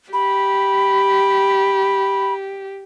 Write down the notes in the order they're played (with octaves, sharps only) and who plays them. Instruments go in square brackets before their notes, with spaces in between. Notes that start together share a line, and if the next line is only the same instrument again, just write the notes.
[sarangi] G4 [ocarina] B5